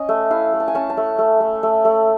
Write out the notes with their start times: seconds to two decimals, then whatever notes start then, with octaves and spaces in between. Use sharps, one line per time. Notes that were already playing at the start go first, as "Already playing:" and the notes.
Already playing: C#4 D#5
0.09 A3
0.31 E4 F5
0.53 A3
0.60 A5
0.68 G#5
0.75 C#4 A5
0.90 A5
0.97 A3
1.19 A3
1.40 A3
1.63 A3
1.85 A3